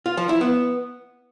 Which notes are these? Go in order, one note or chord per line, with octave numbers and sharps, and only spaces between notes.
F4
F3
E4
B3